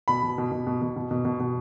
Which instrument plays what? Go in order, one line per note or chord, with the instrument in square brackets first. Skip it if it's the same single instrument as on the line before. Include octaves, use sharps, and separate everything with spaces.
[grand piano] B2 B5
B2
B2
B2
B2
B2
B2
B2
B2
B2